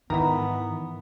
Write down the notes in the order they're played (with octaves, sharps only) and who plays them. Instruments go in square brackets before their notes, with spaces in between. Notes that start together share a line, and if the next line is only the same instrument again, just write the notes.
[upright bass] G#2 [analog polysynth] D#3 E3 [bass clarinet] B3 [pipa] E5 A#5